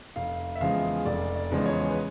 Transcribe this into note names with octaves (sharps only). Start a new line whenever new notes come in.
F1 F5
E5
E2 C#3 F3 G#3 F5
F1 D5
D5
E2 C#3 F3 G#3
C#5
B4